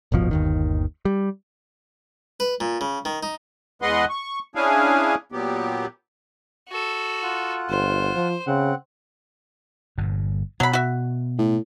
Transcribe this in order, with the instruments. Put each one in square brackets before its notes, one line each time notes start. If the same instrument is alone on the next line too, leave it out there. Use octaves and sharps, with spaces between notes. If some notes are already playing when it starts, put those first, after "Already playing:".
[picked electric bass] D#1 G#1 B2 F3
G1 D#2 D#3
G3
[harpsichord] B4
A#2
C#3
D#3
D#4
[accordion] E2 G#3 B4 D#5 F#5 C6
C#6
C#4 D4 E4 G#4 F5 G#5
A#2 F#3 B3 G4
[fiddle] F#4 A4
[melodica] F4 F#5
[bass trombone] G1 [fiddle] C5
[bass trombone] F3
[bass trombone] C#3 [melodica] C4 F#5
[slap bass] G1 G2 A#2
[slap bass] B2 B3 [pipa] F#3 B5
[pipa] F#4 E5
[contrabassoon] A2